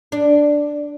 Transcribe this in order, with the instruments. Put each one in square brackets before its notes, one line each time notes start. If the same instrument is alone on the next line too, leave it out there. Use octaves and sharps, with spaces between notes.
[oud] D4